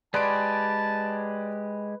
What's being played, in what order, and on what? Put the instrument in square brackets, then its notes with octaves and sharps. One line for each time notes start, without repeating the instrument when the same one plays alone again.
[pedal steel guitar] G#3 G4 G#4 [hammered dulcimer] B4 [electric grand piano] D5 C6 D7 [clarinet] A5